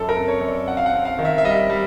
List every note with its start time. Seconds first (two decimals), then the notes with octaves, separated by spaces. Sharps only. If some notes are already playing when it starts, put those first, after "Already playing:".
Already playing: F#2 A4
0.09 A#4
0.16 C4
0.28 C#5
0.41 F#2
0.48 D5
0.67 C4 F#5
0.77 F5
0.86 F#5
0.93 C4
1.05 F5
1.19 D#3
1.25 E5
1.38 E5
1.44 G3 D#5
1.70 G3